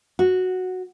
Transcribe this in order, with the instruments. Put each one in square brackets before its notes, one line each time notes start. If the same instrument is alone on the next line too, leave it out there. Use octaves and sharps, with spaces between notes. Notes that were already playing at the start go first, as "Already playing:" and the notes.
[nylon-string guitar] F#4